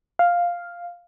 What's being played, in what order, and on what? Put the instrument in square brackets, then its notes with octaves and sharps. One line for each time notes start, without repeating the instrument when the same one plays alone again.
[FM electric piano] F5